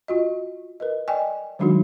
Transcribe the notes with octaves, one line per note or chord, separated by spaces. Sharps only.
F4 F#4 D#5
A#4 B4 D#5
D5 D#5 G5 G#5
D#3 F#3 G#3 D4 D#4 F#4